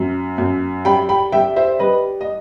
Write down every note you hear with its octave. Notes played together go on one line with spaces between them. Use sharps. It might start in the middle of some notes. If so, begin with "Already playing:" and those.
Already playing: F#2
F#2
G3 G5 B5
G5 B5
G3 E5 G5
C5 E5
G3 B4 D#5
D#5